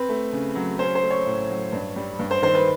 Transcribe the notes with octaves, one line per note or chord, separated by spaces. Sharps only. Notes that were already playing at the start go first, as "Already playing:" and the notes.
Already playing: C4 B4
A3
C#3
F#3
C#4 C5
C5
A3
C#5
A2
F#3
G2
G3
G2
C5
D#3 C5
B4